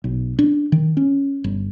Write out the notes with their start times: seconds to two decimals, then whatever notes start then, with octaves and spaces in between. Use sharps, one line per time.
0.04 B1
0.39 D4
0.72 D#3
0.97 C#4
1.44 G1